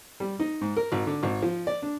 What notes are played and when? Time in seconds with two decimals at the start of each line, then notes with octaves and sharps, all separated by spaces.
0.20 G3
0.40 D#4
0.61 G#2
0.77 A#4
0.92 G#1
1.07 D3
1.23 G#1
1.42 F3
1.67 D5
1.82 D4